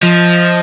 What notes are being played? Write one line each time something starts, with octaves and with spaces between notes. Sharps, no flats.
F3 D#5